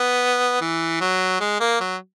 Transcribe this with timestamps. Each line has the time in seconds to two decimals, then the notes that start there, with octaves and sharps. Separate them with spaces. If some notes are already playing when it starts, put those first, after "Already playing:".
Already playing: B3
0.61 E3
1.01 F#3
1.40 G#3
1.60 A#3
1.80 F#3